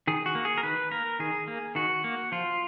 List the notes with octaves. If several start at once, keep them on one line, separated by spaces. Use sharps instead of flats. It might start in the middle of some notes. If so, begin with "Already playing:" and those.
D#3 G#4
F#4
A#3
G#4
A#4
D#3 B4
A#3 A#4
D#3 G#4
A#3
D#3 F#4
A#3
F3 F4